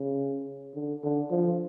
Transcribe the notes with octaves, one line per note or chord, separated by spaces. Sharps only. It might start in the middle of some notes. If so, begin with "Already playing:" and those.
Already playing: C#3
D3
D3
F3